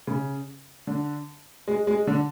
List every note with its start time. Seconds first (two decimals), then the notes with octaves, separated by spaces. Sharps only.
0.07 C#3
0.87 D3
1.68 G#3
1.87 G#3
2.07 D3